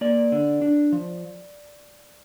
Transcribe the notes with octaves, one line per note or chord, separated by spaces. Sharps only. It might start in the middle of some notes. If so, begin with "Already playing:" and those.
A#3 D5
D3
D4
F3